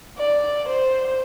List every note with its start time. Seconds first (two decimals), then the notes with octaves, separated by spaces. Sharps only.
0.18 D5
0.68 C5